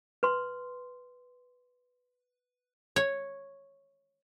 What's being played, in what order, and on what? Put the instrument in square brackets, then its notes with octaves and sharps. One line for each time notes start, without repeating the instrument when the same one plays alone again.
[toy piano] B4 C6
[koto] C#5